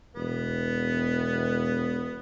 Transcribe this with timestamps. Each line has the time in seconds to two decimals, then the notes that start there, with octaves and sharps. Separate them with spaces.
0.16 E1 B3